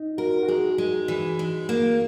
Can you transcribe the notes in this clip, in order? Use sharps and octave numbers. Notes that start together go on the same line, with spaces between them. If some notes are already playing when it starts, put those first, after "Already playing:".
Already playing: D#4
F#4 A#4
F#4
G#3 G#4
G#3
E3
G#3
A#3